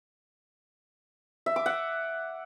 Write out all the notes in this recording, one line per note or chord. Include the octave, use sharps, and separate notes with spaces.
E5
D6
F#5